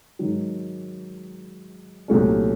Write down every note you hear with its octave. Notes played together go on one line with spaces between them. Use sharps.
G#2 D#3 F#3
C2 A#2 F#3 A3 C#4